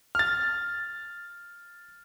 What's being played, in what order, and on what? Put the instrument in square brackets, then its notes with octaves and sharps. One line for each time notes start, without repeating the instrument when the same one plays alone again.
[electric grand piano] F6 A6